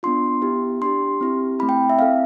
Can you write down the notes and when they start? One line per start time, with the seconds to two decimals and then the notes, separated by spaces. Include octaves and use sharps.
0.03 B3 D4 F4 C6
0.42 B3 E4 G4
0.82 D4 G4 C6
1.21 C4 E4 G4
1.59 A3 C4 E4 B5
1.69 G5
1.90 E5
1.98 C4 E4 A4 F5